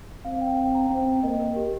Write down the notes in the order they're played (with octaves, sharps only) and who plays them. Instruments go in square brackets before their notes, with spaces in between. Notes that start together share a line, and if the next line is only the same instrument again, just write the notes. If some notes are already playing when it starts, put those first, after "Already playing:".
[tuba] C4 [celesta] F5
[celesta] G5
G5
A#5
[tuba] C4 [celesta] G5
[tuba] A#3 [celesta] D#5
[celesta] A#4
G4